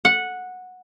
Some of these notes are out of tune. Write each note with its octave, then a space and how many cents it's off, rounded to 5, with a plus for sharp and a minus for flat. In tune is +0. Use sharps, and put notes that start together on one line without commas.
F#5 -10